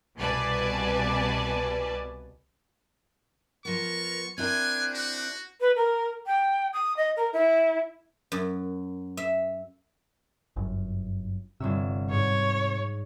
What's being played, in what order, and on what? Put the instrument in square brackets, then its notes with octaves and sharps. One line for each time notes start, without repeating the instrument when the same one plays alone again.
[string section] C2 B2 B4 D5 G#5 A5
[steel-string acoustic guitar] F3 B3 [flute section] A#4 [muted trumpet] C#6
[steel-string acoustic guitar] C4 E4 A#4 [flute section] D4 F#6 G6 [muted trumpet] G#5
[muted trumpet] F#4
[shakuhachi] B4
A#4
G5
D#6
D#5
A#4
E4
[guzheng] F#2
E5
[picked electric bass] G1 F#2
[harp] G1 C#5 E6 [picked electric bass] C3
[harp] G#2 [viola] C#5